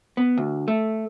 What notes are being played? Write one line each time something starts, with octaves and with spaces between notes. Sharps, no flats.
B3
D2
A3